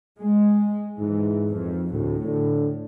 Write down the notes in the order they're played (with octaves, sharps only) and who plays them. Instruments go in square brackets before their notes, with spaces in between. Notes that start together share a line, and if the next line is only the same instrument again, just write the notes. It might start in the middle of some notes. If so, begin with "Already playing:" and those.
[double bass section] G#3
[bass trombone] G#2 [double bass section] E3
[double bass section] F2
[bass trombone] D2 [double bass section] A2
[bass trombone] D3